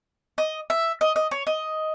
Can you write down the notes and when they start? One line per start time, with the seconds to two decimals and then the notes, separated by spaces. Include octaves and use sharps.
0.38 D#5
0.70 E5
1.01 D#5
1.16 D#5
1.31 C#5
1.47 D#5